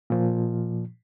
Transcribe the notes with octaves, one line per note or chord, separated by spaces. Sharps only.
A#2 F3